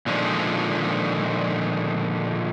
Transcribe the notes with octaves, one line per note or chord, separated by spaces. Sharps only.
A#2 D3 D#3 F3 G#3